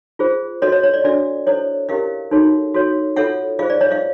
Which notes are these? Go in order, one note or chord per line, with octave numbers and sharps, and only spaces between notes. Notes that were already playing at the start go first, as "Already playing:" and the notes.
F4 G#4 C5
F#4 A4 C#5 D#5
C#5 D#5
C#5
D5
D4 F#4 A4 D5 E5
E4 A4 C5 C#5 D#5
C#4 E4 G4 A#4 D#5 F5
D#4 F#4 A4 C#5
F#4 A4 C#5
F4 A4 C#5 E5 F#5
F4 G#4 C5 D#5 F5
D5
C#5 D#5
D#5 F5